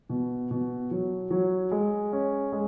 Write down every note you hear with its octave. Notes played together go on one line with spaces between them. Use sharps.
B2
B2
F#3
F#3
G#3
C#4
G#3